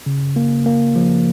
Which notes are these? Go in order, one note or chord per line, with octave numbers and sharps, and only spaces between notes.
C#3
A#3
A#3
F3